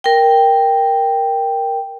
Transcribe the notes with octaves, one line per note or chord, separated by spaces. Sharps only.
A#4 G5